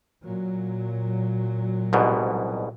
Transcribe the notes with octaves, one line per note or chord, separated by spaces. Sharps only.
A#2 F#3
C2 G#2 B2